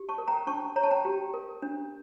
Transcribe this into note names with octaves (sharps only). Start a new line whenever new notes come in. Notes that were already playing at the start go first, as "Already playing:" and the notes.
Already playing: G4
A5 C#6
A#4
G5 A#5
D4 A5 C#6
C#5 A#5
A5
G5 A#5
G4
A#4
D4